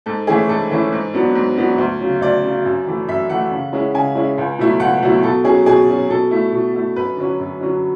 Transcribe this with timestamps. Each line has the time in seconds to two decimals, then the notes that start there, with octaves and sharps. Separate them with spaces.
0.06 G#2 A4
0.27 E3 A3 C#4 E4 G#4
0.49 G#2 A4
0.71 E3 A3 C#4 E4
0.92 G#2
1.14 F#3 B3 D4
1.35 G#2
1.58 F#3 B3 D4
1.78 D2
2.00 C#3 F#3
2.21 D2 D5
2.43 C#3 F#3
2.65 F#2
2.87 E3 A3
3.08 F#2 E5
3.29 E3 A3 F#5
3.51 C#3
3.73 G#3 C#4 E4
3.94 C#3 G#5
4.15 G#3 C#4 E4
4.38 C#2
4.59 B2 F#3 A3 E4
4.80 C#2 F#5
5.03 B2 F#3 A3 E4
5.23 B2 A4
5.45 F#3 C#4 G#4
5.66 B2 G#4
5.88 F#3 C#4
6.10 B2 A4
6.31 A3 E4
6.52 B2
6.75 A3 E4
6.96 F#2 B4
7.17 D3 F#3 C#4
7.40 F#2
7.61 D3 F#3 C#4